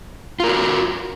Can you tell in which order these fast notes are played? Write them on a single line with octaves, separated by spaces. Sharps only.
F4 A#4 F#4